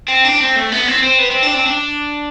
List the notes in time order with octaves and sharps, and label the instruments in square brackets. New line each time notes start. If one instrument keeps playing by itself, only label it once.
[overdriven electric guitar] C4
D4
C4
A3
B3
C4
C4
B3
C4
D4
C4
D4